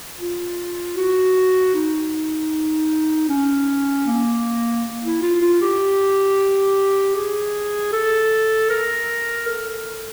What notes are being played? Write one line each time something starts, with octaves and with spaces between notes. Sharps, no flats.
F4
F#4
D#4
C#4
A#3
E4
F4
F4
G4
G#4
A4
A#4
A4